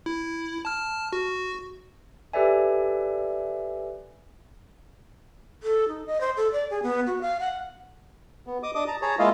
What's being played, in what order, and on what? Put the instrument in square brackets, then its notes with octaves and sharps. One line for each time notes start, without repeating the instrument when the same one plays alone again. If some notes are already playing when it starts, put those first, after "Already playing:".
[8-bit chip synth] E4
A5 F6
F#4
[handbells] G4 A4 B4 D5 E5 G#5
[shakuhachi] A4
D#4
D#5
C5
A4
D5
G#4
B3
F#4
F5
F#5
[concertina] B3
D#5 D6 D#6
D4 D#5 D6 D#6
A5 A#5
G#4 C#5 A5 A#5
G#3 A#3 E4 F4 D#5 F5